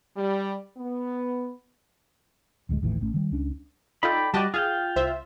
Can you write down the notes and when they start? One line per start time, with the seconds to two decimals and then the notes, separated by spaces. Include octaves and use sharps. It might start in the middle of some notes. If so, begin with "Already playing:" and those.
0.17 G3
0.77 B3
2.69 D1 D2 D#3 G#3
2.82 G#1 D#2 A2 E3
3.01 G#1 A3 C#4
3.14 D#3 G3
3.31 C#2 C#4 D4
4.03 D#4 F4 A4 D5 G5 B5
4.34 G3 F#4 D5 D#5 G5 A5
4.54 F4 G#4 F5 G5
4.96 C2 C5 E5